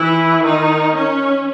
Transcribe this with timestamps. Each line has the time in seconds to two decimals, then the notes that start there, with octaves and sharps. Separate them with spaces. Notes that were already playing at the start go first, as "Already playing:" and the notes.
Already playing: E3 E4
0.44 D#3 D#4
0.96 C#4